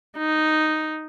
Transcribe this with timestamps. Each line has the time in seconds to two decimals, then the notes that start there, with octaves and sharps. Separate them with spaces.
0.18 D#4